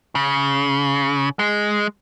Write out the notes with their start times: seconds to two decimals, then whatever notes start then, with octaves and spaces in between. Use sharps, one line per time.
0.15 C#3
1.39 G#3